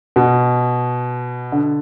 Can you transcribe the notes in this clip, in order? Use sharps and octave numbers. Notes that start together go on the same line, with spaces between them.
B2
D3